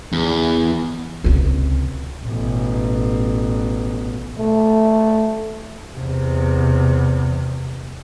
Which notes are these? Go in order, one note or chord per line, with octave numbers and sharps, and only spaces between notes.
E2
C#2 C3
A1 B2
A3
E2 C3